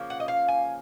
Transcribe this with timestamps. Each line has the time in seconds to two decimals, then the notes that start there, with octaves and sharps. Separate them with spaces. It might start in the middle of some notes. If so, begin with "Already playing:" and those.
Already playing: C#3 F3 A#3 C#4
0.10 F#5
0.20 D#5
0.28 F5
0.48 G#5